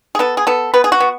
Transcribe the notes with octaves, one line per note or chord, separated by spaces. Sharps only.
G#4
B3 A4
G#4
B3 A4
B3 B4
G#4
F#4
B3